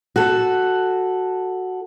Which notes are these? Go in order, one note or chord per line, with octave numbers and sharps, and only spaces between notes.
F#4 A4